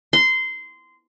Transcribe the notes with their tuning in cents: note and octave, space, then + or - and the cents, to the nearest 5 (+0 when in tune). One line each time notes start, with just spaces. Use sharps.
C6 -15